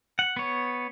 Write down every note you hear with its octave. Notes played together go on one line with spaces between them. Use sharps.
F#5
B3 C#5